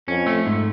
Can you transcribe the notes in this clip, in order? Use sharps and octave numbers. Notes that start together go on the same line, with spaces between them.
F2 C#4
A3
G#2